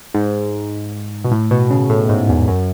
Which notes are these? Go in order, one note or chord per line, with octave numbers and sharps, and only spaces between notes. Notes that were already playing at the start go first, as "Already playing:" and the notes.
G#2
B2
A2
B2
C#3
A2
G#2
E2
F#2